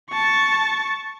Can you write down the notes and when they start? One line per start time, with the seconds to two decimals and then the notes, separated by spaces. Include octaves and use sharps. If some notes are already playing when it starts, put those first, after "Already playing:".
0.11 A5 C#6